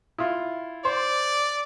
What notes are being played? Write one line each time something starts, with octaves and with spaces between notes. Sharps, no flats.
E4 F4
C5 D5